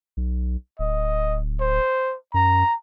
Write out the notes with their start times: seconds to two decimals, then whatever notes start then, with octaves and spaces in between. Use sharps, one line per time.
0.17 B1
0.79 D1 D#5
1.60 C5
2.34 F#2 A#5